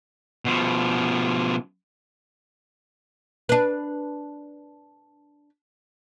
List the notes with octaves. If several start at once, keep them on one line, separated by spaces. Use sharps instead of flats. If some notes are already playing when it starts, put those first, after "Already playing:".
B2 F3
D4 B4